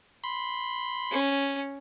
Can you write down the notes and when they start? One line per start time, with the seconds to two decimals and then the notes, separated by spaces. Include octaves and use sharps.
0.24 B5 C6
1.11 C#4